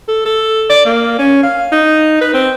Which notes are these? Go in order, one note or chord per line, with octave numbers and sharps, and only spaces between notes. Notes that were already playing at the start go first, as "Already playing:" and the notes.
A4
A4
D5
A#3
C#4
F5
D#4
B4
C4